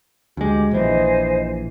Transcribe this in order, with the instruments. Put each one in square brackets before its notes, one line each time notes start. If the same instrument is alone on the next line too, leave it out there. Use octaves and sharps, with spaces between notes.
[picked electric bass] D2 G#3 [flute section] G4
[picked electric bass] A#1 E3 [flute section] C5 D#5 G#5